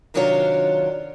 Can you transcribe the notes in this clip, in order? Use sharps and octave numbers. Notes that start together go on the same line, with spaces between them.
C3 D#3 F#3 D4 F4 C#5